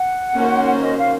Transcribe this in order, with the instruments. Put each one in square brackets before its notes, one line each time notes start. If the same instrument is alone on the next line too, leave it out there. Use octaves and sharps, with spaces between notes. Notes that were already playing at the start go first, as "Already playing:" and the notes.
Already playing: [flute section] F#5
[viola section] D#3 A#3 C#4 F#4 C5
[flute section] D#5
F5